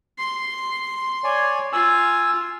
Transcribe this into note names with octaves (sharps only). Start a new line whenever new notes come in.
C6
C#5 D5 G#5
F4 G#5 E6